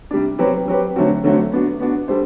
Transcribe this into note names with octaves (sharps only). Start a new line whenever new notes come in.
C3 G3 D4
F#3 C4 G4 B4
F#3 C4 G4 B4
D3 F#3 A3 C4 F#4
D3 F#3 A3 C4 F#4
B3 D4 F#4
B3 D4 F#4
G3 D4 A4 C5